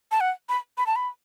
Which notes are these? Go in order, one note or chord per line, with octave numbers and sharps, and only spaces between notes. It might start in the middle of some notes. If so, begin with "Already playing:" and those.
A5
F#5
B5
B5
A5
B5